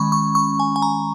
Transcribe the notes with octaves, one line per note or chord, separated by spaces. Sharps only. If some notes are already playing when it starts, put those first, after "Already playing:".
Already playing: D#3 G#3 C#4 B5 C#6
C#6
C#6
G#5
G#5
A#5